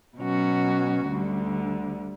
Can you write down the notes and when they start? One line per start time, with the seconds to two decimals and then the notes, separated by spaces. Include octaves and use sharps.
0.19 B2 F#3 C#4 F#4
1.08 D2 D3 G3